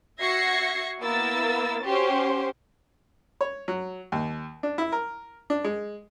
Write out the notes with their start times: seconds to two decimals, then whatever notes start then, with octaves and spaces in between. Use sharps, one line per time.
0.21 F#4 E5 G#6 A#6 C7 C#7
1.02 A#3 B3 E4 A#4 E6 A6
1.84 C#4 F#4 G4 C5 C6
3.41 C#5
3.68 F#3
4.12 D#2
4.63 D4
4.78 E4
4.92 A#4
5.50 D4
5.64 G#3